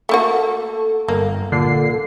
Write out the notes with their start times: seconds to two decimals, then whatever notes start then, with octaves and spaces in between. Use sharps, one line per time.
0.09 A3 A#3 F#4 A4
1.08 G1 A#3
1.52 A#2 D3 C7